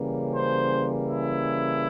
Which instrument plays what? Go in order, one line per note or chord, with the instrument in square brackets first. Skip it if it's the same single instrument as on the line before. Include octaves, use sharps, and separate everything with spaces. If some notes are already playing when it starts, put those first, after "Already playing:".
Already playing: [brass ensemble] C#3 E3 G3 A#3 C#4
C5
E4